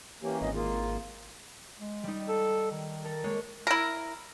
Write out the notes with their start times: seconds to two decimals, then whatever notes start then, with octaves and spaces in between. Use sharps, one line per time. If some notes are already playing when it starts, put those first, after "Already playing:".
0.22 E3 A#3 C#4 G4
0.41 G#1 D#5
0.54 A#3 F4 G#4
1.79 G#3
2.03 G3 D#4
2.29 A4
2.72 D#3
3.05 A4 A#4 A#5
3.24 G#3 A#3 C#5
3.67 E4 A#4